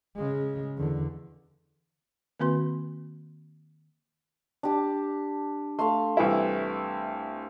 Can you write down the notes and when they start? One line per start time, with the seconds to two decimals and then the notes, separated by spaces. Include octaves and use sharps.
0.16 C#3 G#3
0.77 E2 D3
2.40 D#3 A#3 C4 F#4 B4 C6
4.63 D4 G4 A5
5.79 A3 A4 F5 C6
6.17 C2 E3 E4